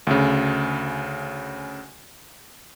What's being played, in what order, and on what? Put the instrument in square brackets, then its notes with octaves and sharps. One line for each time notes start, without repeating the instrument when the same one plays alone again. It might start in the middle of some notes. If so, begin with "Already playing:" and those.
[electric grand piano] D2 C#3